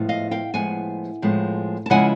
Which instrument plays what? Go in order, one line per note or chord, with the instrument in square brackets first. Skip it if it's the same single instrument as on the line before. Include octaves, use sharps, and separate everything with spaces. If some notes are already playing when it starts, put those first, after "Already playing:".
Already playing: [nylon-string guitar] A2 F3 G#3 B3
D#5 F5
F5 G5
A2 F3 G#3 B3 F#5 G#5
A2 F3 G#3 B3
A5
C#3 F3 G#3 B3 E4 F#5 G#5